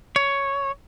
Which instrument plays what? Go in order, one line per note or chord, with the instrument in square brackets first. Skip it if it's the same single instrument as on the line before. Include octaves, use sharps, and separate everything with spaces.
[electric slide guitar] C#5